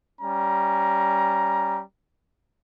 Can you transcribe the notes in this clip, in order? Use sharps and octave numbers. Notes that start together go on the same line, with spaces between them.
G3 C#4 A#5